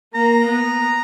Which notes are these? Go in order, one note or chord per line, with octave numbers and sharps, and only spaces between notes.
A#3 A#5
B3